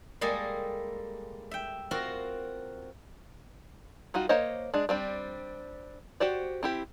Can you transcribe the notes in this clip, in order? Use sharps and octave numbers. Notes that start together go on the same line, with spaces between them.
G3 G#3 A#3 G#4 A4
E5 G5
C4 F4 F#4 A#4
G3 D#4 F4 F#4
A#3 C5 C#5 D#5
G#3 D4
G3 C4 D4
F#4 G4 C5 D5
C4 E4 G4